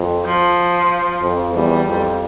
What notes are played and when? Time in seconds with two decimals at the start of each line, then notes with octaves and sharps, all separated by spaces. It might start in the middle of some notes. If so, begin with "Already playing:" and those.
Already playing: F2
0.25 F3
1.22 F2
1.53 E2 G3
1.86 F2